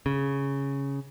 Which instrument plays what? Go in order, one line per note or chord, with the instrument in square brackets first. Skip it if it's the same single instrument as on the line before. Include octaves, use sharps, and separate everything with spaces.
[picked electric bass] C#3